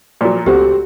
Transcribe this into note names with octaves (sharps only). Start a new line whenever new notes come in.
A#2 F3 F#3
C#2 A3 C4 F#4 G4